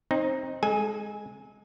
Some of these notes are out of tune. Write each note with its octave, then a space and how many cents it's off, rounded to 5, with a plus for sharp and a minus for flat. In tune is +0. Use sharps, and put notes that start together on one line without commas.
C4 +25 D#4 +0
G#3 +0 A4 -40 G#5 +0